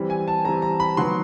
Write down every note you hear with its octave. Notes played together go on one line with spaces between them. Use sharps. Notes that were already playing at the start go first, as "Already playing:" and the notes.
Already playing: E3 G3 C4
G#5
A5
E3 G3 C4 A#5
A#5
B5
D#3 F#3 B3 C6